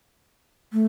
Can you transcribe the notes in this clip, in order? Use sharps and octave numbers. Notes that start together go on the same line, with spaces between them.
A3